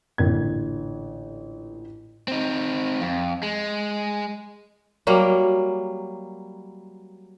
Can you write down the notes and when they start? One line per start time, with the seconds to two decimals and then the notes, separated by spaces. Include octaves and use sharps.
0.18 A1 A#2 D3 D4 G#6
2.28 C4 D#4
3.01 F2
3.43 G#3
5.07 F#3 G3 A#3